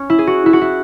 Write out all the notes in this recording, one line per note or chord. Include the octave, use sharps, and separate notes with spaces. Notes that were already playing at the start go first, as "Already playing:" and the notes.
Already playing: C#4
E4
G#4
F#4
E4
F#4
E4